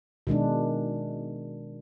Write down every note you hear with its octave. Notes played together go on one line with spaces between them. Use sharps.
B2 D#3 G#3 D4